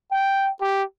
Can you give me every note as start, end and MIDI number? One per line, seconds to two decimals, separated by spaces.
0.11 0.51 79
0.60 0.83 67